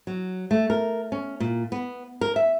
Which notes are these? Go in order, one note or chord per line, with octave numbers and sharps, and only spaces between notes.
F#3
A3
A#4
C#4
A#2
B3
A#4
E5